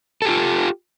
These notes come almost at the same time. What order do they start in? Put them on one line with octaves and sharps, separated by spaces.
A4 G4 F4